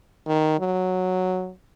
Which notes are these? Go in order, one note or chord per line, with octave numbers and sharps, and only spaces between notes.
D#3
F#3